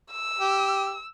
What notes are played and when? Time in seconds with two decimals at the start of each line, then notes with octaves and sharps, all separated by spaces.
0.11 E6
0.40 G4